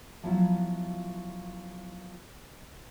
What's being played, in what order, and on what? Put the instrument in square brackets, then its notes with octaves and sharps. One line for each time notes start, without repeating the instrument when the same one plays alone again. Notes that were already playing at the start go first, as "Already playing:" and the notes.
[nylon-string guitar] F3 F#3 B3 E4 F4